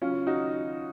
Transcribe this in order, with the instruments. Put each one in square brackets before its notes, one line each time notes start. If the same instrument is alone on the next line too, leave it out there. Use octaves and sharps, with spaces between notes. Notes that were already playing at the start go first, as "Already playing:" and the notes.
[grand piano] C#3 F#3 C#4 F4
D#4 F#4